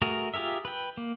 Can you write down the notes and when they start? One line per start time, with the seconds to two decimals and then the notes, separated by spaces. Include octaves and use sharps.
0.02 A3 F#4 G#4 A#4
0.34 F4 G4 G#4 A#4 E5
0.65 B4 G5
0.97 A#3